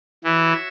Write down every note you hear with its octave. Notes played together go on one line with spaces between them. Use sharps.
E3 F#4 C#5 E5